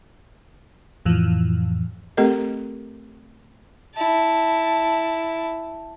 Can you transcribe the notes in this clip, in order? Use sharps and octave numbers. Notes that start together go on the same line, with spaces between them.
F2 A2 E3 F3
A3 C4 G4 A4 A#4 D#5
E4 A5